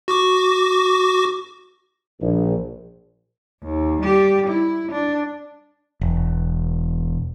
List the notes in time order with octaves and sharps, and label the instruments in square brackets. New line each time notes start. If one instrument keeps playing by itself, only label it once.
[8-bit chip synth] F#4 C#6 D6
[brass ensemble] A#1
[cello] D#2
G3 G4
E4
D4
[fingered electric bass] E1